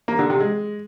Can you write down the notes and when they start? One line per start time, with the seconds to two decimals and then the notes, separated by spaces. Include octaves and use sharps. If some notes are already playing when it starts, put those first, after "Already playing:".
0.08 A#3
0.19 D3
0.30 C3
0.40 G#3